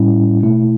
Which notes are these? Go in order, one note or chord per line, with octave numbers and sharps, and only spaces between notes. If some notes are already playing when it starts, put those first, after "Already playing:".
Already playing: A2 G3 C#4 E4
B2 A3 E4